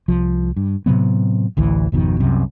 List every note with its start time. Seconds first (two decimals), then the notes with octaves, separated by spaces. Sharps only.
0.08 C2 F3
0.57 G2
0.86 A2 C3 F#3 B3
1.57 A1 D2 E3
1.92 G#1 F2 B2 D#3
2.20 C2 F#2 C3